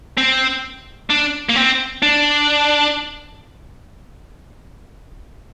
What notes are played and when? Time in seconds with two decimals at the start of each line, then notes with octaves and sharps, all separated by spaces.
0.17 C4
1.10 D4
1.49 A#3
1.56 C4
2.03 D4